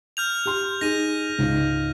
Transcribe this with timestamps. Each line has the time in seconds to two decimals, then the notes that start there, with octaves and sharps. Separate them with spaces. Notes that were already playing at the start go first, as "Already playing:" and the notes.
0.17 F6 G6 F7
0.46 G4 C6
0.81 D#4 G#4 A#6 D#7
1.38 C#2 G#2